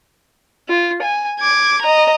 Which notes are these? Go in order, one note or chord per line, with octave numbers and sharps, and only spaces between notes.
F4
G#5
D6 G#6
D#5 A#5